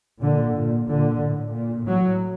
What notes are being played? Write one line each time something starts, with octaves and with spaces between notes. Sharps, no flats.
A#2 D3
A#2
A#2 D3
A2
A#2
A2 F#3